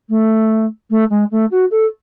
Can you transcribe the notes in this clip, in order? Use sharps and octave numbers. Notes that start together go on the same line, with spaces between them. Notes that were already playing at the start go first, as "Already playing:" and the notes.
A3
A3
G#3
A3
F#4
A4